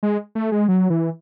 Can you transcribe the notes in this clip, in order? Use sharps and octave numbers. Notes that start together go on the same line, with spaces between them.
G#3
A3
G#3
F#3
E3